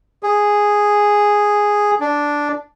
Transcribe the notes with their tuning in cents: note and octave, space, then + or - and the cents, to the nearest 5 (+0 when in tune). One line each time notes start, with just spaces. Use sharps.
G#4 -5
D4 -5